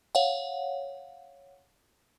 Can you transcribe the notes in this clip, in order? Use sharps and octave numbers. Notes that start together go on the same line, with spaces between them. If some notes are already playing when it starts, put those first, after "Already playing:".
C#5 F5 F#5